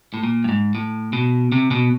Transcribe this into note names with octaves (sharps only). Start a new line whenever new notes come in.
A2
A#2
G2
G#2
A2
B2
C3
B2